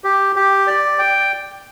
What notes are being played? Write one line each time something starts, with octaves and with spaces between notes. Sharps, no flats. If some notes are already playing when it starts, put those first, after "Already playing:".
G4
G4
D5
G5